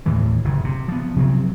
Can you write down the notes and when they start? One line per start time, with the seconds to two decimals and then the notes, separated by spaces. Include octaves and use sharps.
0.06 D#2 A2 D#3 E3
0.44 F#1 C#3
0.64 C3
0.88 F3 B3
1.16 C3 F3 F#3 C4